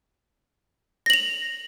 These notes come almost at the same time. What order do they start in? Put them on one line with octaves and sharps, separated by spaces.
A#6 F#7 F7